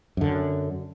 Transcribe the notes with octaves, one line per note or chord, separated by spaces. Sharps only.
F#2 D3